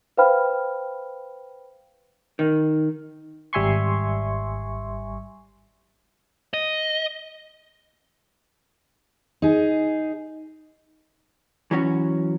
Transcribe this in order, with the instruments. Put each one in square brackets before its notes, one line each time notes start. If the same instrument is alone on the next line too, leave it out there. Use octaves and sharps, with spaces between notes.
[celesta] B4 C5 F5 G5 B5 F6
[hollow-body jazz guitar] D#3
[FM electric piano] G#1 G3 E5 G#5 C6 C#6
[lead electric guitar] D#5
[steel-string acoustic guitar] D#4 G#4
[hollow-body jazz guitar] E3 F#3 C#4 F#4